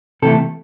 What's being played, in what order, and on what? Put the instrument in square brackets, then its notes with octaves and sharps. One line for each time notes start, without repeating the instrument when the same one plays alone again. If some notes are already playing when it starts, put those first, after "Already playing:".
[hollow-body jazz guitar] C3 E3 A3 A4